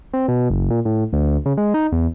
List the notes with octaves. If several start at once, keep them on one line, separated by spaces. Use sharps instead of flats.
C4
B2
F#1
A#2
A2
D2
C#3
G#3
D#4
E2